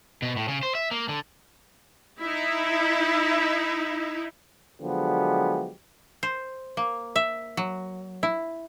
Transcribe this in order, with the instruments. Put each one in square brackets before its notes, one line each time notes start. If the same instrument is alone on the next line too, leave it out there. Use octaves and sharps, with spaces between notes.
[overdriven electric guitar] B2
A2
C#3
C5
E5
A#3
D3
[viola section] D#4 E4
[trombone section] D3 F3 F#3 G#3 B3 G4
[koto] C5
A#3
E5
F#3
E4